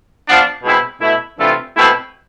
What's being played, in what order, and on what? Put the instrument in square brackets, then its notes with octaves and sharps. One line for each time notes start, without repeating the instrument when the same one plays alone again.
[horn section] F3 B3 D4
B2 G#3 C4 E4
B2 A3 E4
C3 E3 A3 D4 F4
B2 A3 C4 E4